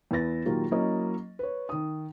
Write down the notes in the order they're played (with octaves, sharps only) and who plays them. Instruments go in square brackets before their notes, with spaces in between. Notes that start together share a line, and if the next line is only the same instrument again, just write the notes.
[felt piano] E2 E4 B4 A6 A#6
A#2 D#3 F#3 A#3 F4 G4
F#3 A#3 C#4 E4 D#5
B4 C#5
D#3 D#6